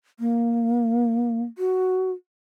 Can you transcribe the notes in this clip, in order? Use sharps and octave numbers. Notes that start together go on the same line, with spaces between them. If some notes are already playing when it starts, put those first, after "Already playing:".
A#3
F#4